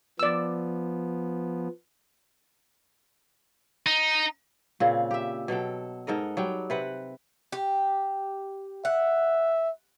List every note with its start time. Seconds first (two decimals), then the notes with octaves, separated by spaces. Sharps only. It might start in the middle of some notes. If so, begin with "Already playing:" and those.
0.19 F3 B3 D5 E6
3.86 D#4
4.80 A#2 C#3 C4
5.11 G4 E5
5.48 B2 F#3 A4 G5
6.07 G#2 A4 A#4 D#5
6.37 F#3 G3 G5
6.70 C3 B4 F#5
7.52 G4
8.85 E5 F#5